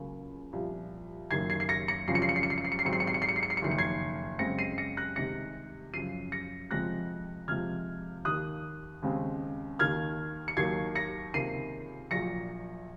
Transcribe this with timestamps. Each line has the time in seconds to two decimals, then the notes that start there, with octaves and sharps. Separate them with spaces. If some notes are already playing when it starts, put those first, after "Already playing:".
Already playing: C#2 C#3 F#3 A#3
0.53 C2 A#2 F3
1.30 F#1 F#2 D#3 A#3 G#6 C7
1.50 G#6 C7
1.60 C7
1.69 A#6 C#7
1.88 A#6 C#7
2.08 G#1 F#2 C#3 F3 C7
2.15 C#7
2.22 C7
2.29 C#7
2.36 C7
2.43 C#7
2.50 C7
2.58 C#7
2.65 C7
2.72 C#7
2.79 C7
2.85 G#1 G#2 F#3 C4 C#7
2.93 C7
3.00 C#7
3.07 C7
3.14 C#7
3.22 C7
3.29 C#7
3.36 C7
3.43 C#7
3.50 C7
3.57 C#7
3.62 F#1 F2 D#3 C7
3.71 C#7
3.78 G#6 C7
4.39 F#2 C#3 G#3 C4 A#6 C#7
4.59 C7 D#7
4.78 A#6 C#7
4.97 F#6 A#6
5.16 C2 C3 D#3 G#3 A#6 C#7
5.93 F#2 C#3 F3 C7 D#7
6.32 A#6 C#7
6.71 F2 C3 F3 G#3 C4 F#6 A#6
7.48 F2 C3 F3 G#3 F6 G#6
8.25 D#2 D#3 A#3 D#6 F#6
9.02 D#2 C#3 G#3 C4
9.79 D#2 D#3 A#3 F6 G#6
10.48 C#7
10.57 D#2 D#3 F#3 A#3 G#6 C7
10.95 A#6 C#7
11.34 C#2 C3 D#3 A#3 C7 D#7
12.11 A#1 A#2 F#3 A#6 C#7